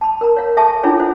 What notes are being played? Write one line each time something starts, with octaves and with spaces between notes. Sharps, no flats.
A5 B5
A#4 A#5
C#5 F5
A4 E5 G#5 A5 C#6
C#4 D4 E4 F4 G#4 C#5
A4 C5